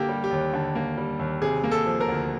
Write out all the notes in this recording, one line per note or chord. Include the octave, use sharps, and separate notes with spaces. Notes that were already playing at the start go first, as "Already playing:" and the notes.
Already playing: D3 A#3 G4 A4
G3
G4
D#2
D3
A#3
G3
D#2
C3 G#4
A#3
A4
F3
A#4
D2